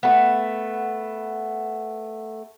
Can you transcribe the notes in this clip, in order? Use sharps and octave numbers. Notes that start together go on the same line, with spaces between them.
A3 B3